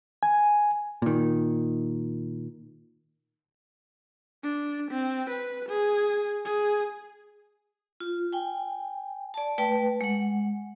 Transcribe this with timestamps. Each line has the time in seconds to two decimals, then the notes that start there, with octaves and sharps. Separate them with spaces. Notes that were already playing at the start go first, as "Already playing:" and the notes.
0.23 G#5
1.02 A#2 D#3
4.44 D4
4.91 C4
5.29 B4
5.69 G#4
6.45 G#4
8.00 F4
8.33 G5 G#5
9.34 D5 A5
9.58 A3 B4 G5 A5
10.01 G#3 F#5